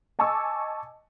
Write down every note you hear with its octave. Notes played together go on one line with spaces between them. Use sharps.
D#5 G#5 A5 C#6 D6 E6